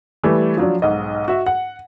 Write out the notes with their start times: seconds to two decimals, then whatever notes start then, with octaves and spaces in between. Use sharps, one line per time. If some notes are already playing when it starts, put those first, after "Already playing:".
0.23 E3 G3 A3
0.57 F3 F#3 D4
0.82 B1 G#2 D#5
1.28 F#4 E5
1.46 F#5